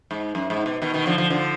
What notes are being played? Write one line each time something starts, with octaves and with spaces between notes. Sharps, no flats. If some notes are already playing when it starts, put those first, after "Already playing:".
G#2
F#2
G#2
B2
B2 D#3
B2 D#3
D3 F3
D3 F3
D3 F3